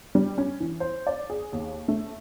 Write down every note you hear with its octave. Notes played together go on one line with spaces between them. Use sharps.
G3
C#4
E3
C5
D5
G#4
D#2
A3